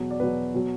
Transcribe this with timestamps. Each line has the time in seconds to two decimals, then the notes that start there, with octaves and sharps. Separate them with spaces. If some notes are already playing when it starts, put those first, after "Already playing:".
Already playing: E2 B2 F#3
0.11 D5
0.19 E2 B2 F#3 B4
0.54 B2 F#3